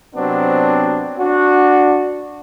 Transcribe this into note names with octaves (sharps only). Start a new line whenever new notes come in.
C3 F#3 B3 C4 D4
D4 F#4